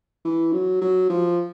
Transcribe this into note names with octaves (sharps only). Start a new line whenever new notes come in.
E3
F#3
F#3
F3